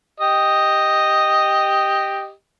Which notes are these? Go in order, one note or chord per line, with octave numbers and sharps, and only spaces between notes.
G4 D#5